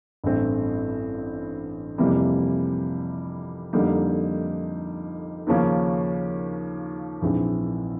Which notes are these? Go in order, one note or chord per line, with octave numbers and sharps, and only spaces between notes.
A1 G2 E3 A3 C4
F2 C3 E3 G3 A#3
F2 D3 G3 A#3 D#4
D#2 C#3 F3 A#3 C#4
A#1 G#2 E3 G#3 C4